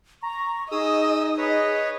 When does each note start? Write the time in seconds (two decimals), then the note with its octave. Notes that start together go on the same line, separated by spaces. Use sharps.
0.23 A#5 C#6
0.71 D#4 G#4 D#5 D#6 E6
1.38 B4 C#5 D#5